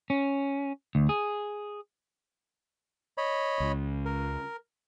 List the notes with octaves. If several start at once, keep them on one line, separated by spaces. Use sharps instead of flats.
C#4
D2
G#4
C#5 D#5 B5
C#2
A#4